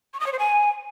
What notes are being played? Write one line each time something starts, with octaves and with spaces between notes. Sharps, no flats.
C#6
D#6
C#5
C5
G#5